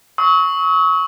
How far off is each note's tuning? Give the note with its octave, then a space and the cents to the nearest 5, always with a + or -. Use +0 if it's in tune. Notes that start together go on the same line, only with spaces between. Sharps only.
C#6 +5 E6 -45